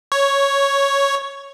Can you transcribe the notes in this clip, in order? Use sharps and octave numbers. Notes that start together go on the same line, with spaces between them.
C#5